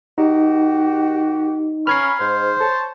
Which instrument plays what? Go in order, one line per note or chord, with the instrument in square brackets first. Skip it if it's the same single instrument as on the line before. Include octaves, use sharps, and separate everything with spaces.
[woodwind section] D#3 F#4 G4 [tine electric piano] D#4
[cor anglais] C#4 [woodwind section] G#5 A#5 B5 [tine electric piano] F6 G#6 C7
[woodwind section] G#2 [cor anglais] C5
[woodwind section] C#5 A5